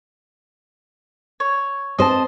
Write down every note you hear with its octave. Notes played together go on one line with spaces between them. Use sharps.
C#5
C4 C5 D#5 A5